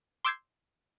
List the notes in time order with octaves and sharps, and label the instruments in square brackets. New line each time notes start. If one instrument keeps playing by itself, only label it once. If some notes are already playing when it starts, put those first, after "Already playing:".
[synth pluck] C6 D6 E6 G6 G#6 C7